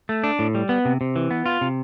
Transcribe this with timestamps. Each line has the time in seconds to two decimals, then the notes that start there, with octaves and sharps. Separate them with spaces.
0.09 A3
0.24 D4
0.39 A2
0.55 G3
0.69 B3
0.85 C3
1.01 C3
1.16 E3
1.31 B3
1.46 F4
1.61 C3